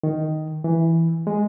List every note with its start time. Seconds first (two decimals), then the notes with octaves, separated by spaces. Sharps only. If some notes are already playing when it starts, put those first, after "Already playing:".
0.03 D#3
0.64 E3
1.27 G#3